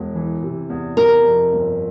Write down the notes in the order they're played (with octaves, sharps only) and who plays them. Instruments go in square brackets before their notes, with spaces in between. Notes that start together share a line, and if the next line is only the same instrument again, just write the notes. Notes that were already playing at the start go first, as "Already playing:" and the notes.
Already playing: [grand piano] E1
E3
C3
E2
[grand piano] C3 [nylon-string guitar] A#4
[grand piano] F2
G1